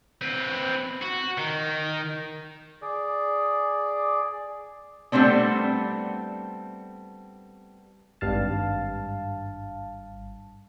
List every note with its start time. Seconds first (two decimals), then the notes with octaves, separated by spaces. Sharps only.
0.22 C4 B4
1.02 F#4
1.38 D#3
2.82 G#4 D5
5.12 G3 A3 B3 C4 D4
8.21 G#1 G2 F5 A5